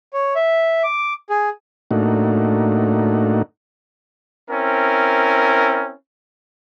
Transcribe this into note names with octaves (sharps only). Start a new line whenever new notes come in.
C#5
E5
D6
G#4
A2 A3 A#3 D4 D#4 F#4
C4 C#4 E4 A#4